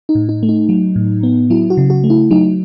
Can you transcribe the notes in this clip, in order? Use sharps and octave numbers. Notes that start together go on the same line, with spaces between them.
D#4
A2
D#4
A3
D#4
F#3
A2
B3
F#3 E4
F#4
C#3
F#4
A3
E4
F#3 D#4